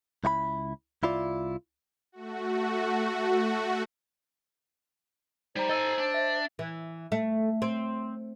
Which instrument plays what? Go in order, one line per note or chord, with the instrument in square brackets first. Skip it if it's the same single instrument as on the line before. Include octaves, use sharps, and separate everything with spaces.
[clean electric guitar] C#2 E4 F#4 B5
C2 E4 F4 D5
[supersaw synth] A3 F#4
[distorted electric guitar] G3 [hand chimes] D#4 A#5 [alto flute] C5
[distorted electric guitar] A4 G#5 [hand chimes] D#5 E6
[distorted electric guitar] D4
[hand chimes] E5
[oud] E3
A3
C4